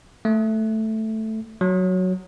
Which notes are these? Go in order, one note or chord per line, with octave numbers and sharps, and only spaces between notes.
A3
F#3